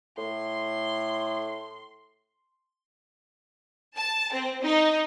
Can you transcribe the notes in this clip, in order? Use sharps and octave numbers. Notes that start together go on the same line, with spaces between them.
A2 C6
A5
C4
D#4